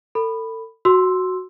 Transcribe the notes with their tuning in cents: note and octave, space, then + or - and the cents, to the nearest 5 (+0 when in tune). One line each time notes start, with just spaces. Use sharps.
A4 +35 B5 +0
F#4 +0 C6 +0 E6 +0